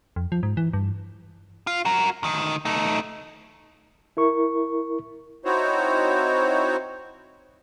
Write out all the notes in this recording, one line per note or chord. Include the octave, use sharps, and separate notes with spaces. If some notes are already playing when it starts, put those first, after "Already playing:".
F2
F3
G#2
E3
G2
F4
F#4 A#4
D2 D#3
A3 D#4
E4 A#4 C#6
C4 D#4 E4 F#4 C5 C#5